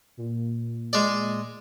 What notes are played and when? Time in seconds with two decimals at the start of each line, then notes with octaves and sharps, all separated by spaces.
0.17 A#2
0.93 G#3 D5